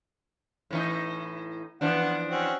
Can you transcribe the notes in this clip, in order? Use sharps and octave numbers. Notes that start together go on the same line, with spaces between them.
A2 E3 D#4
E3 F3 B3 D4 F#5
C4 C#4 F#4